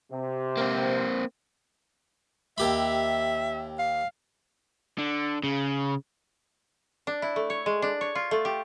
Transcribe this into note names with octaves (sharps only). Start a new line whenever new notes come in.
C3
A#3 C4
D#2 G4 E5 B5
F5
D3
C#3
D4
E4
A3
C#5
G#3
D4
C#5
F4
A3
G4